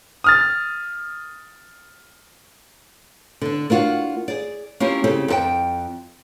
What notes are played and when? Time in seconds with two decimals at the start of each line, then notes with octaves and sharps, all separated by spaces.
0.24 D#6 F6 A6
3.41 D3 D4
3.70 A#3 D4 F4 F#4
4.28 G#4 D5
4.80 A#3 C#4 E4 F4 G4
5.04 C#3 C4 G4 A4
5.28 F2 A4 G5